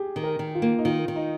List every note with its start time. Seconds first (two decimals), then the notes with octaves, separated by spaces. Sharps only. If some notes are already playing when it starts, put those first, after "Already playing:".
Already playing: G4 G#4
0.16 D#3
0.23 A#4
0.39 D#3
0.55 F4
0.62 A#3
0.78 D#4
0.85 D#3 F4
1.08 D#3
1.16 D#4